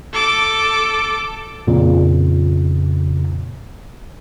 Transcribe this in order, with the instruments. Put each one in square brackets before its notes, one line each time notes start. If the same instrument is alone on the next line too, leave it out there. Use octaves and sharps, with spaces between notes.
[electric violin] A4 D6
[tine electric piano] F2 A#2 C#3